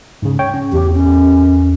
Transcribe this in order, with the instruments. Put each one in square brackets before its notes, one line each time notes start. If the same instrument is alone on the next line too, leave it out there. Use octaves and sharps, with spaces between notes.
[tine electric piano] G#2 C#3
C#5 G5
C#4
[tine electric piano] E2 [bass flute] G4
[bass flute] C#4